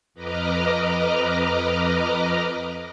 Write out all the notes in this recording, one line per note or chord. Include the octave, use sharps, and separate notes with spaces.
F2 B4 D#5 A#5 D6 F6